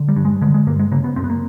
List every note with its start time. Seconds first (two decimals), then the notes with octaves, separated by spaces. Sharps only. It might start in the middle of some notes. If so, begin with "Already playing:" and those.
Already playing: D3
0.08 G3
0.16 G2
0.25 G#3
0.41 D3 G#3
0.54 G#3
0.67 G2 A#3
0.79 G#3
0.91 C#3 A#3
1.04 B3
1.16 F#2 C4
1.24 B3
1.30 A#3